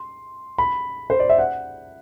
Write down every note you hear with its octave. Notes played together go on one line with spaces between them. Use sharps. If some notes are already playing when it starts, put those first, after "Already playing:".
Already playing: C6
B5
C5
D5
E5
F#5